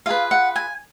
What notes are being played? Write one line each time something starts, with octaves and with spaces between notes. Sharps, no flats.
F4 G#4 B4 F5
F#5
G#5